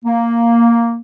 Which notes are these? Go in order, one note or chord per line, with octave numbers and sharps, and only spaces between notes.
A#3